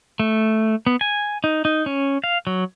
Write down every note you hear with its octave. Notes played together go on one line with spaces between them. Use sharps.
A3
B3
G#5
D#4
D#4
C#4
F5
F#3